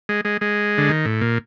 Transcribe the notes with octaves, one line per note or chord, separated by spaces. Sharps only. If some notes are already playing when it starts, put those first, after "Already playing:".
G#3
G#3
G#3
D3
D#3
A2
A#2